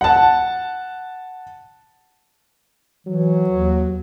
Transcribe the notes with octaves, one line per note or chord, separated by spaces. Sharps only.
F#5 A5
E3 F#3
D#2